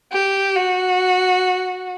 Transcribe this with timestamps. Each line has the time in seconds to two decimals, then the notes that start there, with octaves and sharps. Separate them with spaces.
0.12 G4
0.56 F#4